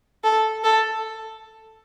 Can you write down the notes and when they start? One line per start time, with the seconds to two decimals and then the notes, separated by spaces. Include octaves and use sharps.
0.24 A4
0.64 A4